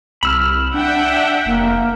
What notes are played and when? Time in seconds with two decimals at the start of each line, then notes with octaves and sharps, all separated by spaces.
0.23 C2 B5 E6 F6
0.74 D4 E5 F#5 G5
1.46 F1 A#3